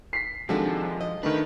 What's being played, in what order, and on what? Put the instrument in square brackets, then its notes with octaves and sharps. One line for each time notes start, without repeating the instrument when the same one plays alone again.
[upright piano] B6 C7
[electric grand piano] C3 D#3 D4 [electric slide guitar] F3 [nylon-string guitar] G#3 F#4 A4
[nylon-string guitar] D#5
[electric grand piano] D#3 A3 D4 [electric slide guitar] B4